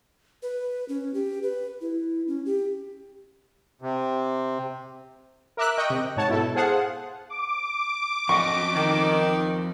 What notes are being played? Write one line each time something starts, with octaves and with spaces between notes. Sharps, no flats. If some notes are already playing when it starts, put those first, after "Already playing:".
B4
C#4
G4
B4
E4
C#4
G4
C3
A#4 E5 D6 E6 F#6
D#5 G5 C#6
C3
G#2 C#5 F#5 A5
B2 E4 A4
G#4 C5 F5 F#5 A5
D6
F2 D#5 C#6
D#3